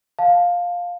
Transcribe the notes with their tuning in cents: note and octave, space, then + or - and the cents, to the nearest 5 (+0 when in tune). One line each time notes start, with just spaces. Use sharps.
F5 +10 A5 +0